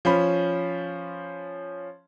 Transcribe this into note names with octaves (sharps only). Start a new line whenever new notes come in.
F3 C#4 B5